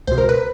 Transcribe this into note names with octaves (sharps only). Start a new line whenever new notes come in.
C#2 B2 C5
A#4
B4